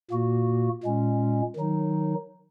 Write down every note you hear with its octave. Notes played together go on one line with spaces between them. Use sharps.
A#2 A#3 F#4
A#2 G#3 C#4
D#3 F#3 D#4